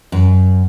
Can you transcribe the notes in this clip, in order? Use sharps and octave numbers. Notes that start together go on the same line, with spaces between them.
F#2